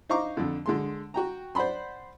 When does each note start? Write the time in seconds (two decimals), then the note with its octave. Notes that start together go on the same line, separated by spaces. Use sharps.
0.09 D#4 C5 F5 A#5 C#6 D6
0.37 F2 D3
0.66 D3 G#3 C6
1.14 F#4 G5 A#5
1.55 C5 D5 F#5 B5 C6